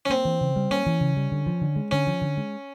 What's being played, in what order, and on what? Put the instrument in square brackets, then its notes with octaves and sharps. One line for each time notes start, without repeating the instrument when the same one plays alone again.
[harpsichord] C#4
[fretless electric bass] A#3 [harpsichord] C4
[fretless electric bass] E3
C#3
G3
[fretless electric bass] A#3 [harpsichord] C#4
[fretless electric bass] E3
C#3
G3
D3
F3
D3
G#3
[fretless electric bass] D3 [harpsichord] C#4
[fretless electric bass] F3
D3
G#3